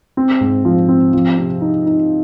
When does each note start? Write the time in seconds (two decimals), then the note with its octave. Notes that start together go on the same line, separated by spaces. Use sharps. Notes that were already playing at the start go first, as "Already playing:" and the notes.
0.17 C4
0.41 G#2
0.65 F3
0.89 C4
1.13 F3
1.38 C3
1.61 D#4
1.86 D#4